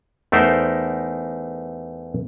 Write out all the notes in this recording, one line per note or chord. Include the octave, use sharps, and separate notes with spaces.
E2 A3 D#4 A#4 C5